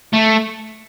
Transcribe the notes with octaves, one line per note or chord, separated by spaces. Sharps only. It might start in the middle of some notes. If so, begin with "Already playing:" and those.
A3